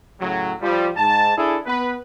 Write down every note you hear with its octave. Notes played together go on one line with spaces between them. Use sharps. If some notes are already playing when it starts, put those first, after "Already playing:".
A2 C#3 F#3
F3 G3
G#2 A5
D4 E4 G#4 A4
B3 B4